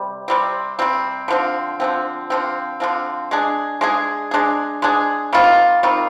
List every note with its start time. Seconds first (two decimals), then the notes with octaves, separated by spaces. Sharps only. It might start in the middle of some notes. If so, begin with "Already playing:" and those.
Already playing: C3 G3
0.28 C3 G3 C4
0.79 C3 G3 C4
1.28 D3 F3 C4
1.80 D3 F3 C4
2.30 D3 F3 C4
2.80 D3 F3 C4
3.31 G#3 D4 G#4
3.81 G#3 D4 G#4
4.31 G#3 D4 G#4
4.82 G#3 D4 G#4
5.33 D#3 G3 C4 F4
5.83 D#3 G3 C4 F4